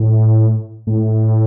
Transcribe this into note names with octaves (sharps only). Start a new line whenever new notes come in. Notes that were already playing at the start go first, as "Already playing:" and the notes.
Already playing: A2
A2